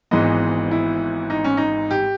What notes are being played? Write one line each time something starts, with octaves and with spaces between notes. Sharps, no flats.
G#1 G#2 E3 G#3 B3 D#5
E4
D#4
C#4
D#4
G4